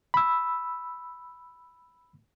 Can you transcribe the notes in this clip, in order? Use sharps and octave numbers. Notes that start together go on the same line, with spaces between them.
B5 E6